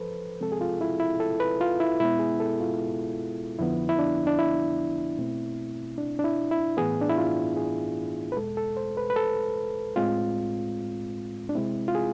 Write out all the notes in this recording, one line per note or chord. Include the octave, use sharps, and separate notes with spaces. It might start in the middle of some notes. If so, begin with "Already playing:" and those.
Already playing: F3 A4 B4 C5
C3 F3 G#3 C4 A4
G#4
F4
E4
E4
A4
B4
F4
E4
B2 G#3 B3 E4
G#4
A4
F4
F2 D3 F3 B3 E4
E4
D4
D4
E4
B2 A3 C4
D4
D4
E4
E4
A2 E3 B3 G#4
D4
E4
F4
G#4
B4
E2 B2 G#3 A4
A4
C5
B4
B4
A4
A2 G#3 C4 F4
D4
C3 G#3 C4 E4
F4
G#4